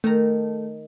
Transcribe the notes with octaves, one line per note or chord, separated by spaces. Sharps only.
D#3 A3 A#5